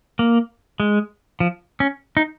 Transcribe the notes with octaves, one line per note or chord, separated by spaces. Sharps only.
A#3
G#3
F3
C#4
D#4